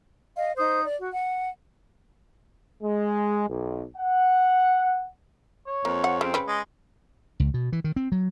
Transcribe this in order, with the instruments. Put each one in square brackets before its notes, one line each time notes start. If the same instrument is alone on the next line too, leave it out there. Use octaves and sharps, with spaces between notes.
[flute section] D#5 F5
D#4 C5 D#6 G6
D5
F#4
F#5
[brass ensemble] G#3
B1
F#5
[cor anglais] C#5
[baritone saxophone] F2 [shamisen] A#3
[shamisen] F#5
[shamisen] C#3 [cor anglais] C4
[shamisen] C#3 B4
[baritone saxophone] G#3 [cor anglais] D#5
[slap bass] C#2
B2
E3
D#3
C4
F#3